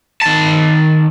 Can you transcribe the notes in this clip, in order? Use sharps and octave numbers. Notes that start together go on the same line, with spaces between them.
D#3 A5